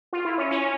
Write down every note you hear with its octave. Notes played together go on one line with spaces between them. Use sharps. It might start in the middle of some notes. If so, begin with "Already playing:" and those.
F4
E4
C#4
C#4